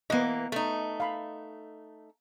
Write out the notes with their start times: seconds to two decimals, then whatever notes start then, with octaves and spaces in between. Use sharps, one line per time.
0.10 E3 A#3 B3 D#5
0.52 A3 D#4
1.00 F5 B5